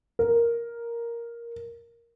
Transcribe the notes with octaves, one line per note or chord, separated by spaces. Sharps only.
A#4